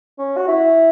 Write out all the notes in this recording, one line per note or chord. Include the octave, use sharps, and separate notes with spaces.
C#4
F#4
E4